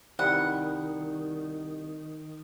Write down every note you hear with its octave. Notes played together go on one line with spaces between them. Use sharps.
C2 D#3 G3 F#5